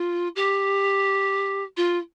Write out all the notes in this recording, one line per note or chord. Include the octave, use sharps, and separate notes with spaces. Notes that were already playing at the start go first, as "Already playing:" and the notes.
Already playing: F4
G4
F4